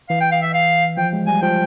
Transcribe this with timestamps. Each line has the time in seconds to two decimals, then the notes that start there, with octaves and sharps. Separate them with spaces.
0.09 E3 F5
0.20 G5
0.32 F5
0.42 E5
0.54 F5
0.97 F3 G5
1.13 G#3
1.27 G3 G#5
1.42 F3 G5